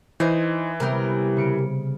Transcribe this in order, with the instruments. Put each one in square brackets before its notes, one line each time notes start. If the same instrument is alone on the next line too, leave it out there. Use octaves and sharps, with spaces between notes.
[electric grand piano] E3 [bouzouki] D#4 C5 G#5
[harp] C3 G3 B3 [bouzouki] G4 A#4
[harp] C#3 C#7 D7